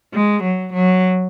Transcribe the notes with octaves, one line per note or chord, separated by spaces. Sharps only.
G#3
F#3
F#3